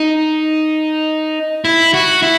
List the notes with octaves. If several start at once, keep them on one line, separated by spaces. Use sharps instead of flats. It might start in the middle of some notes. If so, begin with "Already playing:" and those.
Already playing: D#4
E4
F#4
E4